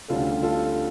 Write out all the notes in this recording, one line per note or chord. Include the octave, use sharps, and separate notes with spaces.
D2 D3 G3 C#4 F4 A4
F4 A4